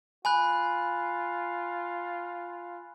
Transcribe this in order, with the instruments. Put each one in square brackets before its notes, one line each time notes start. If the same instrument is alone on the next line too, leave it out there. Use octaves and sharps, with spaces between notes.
[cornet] F4 [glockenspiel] G#5 B5 F#6